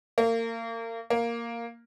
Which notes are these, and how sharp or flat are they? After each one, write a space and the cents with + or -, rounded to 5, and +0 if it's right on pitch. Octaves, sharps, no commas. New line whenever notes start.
A#3 -30
A#3 +0